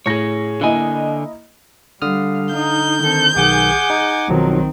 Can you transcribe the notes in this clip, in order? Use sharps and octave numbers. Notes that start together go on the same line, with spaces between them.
A2 G#4 C#5 A#6
D3 A#3 E4 D#5 G#5
D3 G3 F5 D#6 F6
D#4 G6
D#3 C4 A4
B1 D#3 G#4 F#5 G#5 D6
D#4
B1 D#3 F3 F#3 C4